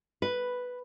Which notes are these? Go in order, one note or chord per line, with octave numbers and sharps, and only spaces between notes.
B4